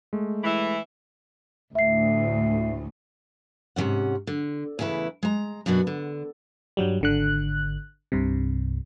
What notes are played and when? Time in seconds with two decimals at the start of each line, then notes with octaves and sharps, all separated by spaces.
0.13 G#3 A3
0.44 E3 E4
1.75 D2 A2 E5 C7
3.76 G#2 C3 E3 C#4 F#5
4.27 D3
4.79 E2 C#3 A3 E4 B4
5.23 G#3 A#5
5.66 F#2 B2 D4 F#4 B4
5.87 D3
6.77 G2 F#3 G3
7.01 G#1 D3 F#6
8.12 C2 G2 C3